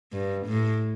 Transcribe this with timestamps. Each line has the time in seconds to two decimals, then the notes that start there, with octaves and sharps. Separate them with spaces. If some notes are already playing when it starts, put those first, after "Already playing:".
0.12 G2
0.47 A2